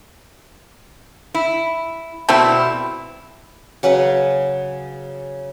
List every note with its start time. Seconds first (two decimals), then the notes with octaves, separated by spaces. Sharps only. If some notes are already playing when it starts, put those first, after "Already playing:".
1.34 E4
2.29 B2 G3 A3 C4 E4
3.83 C#3 F#3 B4 F#5